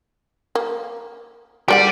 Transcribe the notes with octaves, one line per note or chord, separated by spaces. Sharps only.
A#3
G#3 G4 A#4 D5 F#5